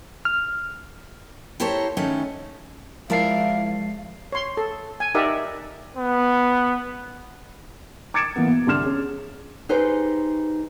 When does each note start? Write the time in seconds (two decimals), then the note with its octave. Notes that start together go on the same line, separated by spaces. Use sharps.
0.25 F6
1.60 E4 G4 A4 A#4 C5 C#5
1.97 D#3 A3 C#4 D#4 E4
3.10 F3 G#3 E4 A#4 D5 F5 A5 C7
4.32 C#5 C6
4.57 A4
5.00 G#5
5.15 D#4 G4 A#4 D5 E5 F#5
5.97 B3
8.14 D6 G#6 A6 C#7 D7 E7
8.36 E3 A#3 B3
8.47 B2
8.67 C2 D3 C6 F6 E7
8.83 C#4 G#4
9.69 D#4 G4 G#4 B4 C5